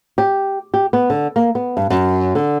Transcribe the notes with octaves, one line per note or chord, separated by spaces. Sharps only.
G4
G4
B3
D3
A#3
B3
G2
F#2
D3